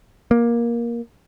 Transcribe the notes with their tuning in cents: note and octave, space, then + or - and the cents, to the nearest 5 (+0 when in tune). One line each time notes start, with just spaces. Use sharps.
A#3 +15